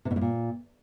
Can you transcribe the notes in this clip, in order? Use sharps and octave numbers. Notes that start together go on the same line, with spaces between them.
C3
B2
A2
A#2